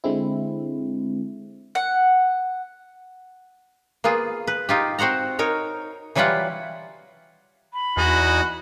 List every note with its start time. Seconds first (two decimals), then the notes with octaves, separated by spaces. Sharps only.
0.04 D3 G#3 C4 E4
1.75 F#5
4.04 A#3 B3 F4 G#4
4.47 B4
4.69 D#4 F4 G4
4.99 C4 F#4 C5 F#5 A#5
5.39 D#4 A#4 C#5
6.15 E3 F#3 G3 E4 F4 F#5
7.73 B5
7.97 E2 D#4 F#4 D#5 G#5